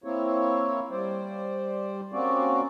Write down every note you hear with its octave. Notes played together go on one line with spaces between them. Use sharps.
A#3 C4 E4 C#5
G3 C5 D5
A#3 C4 C#4 F#4 D5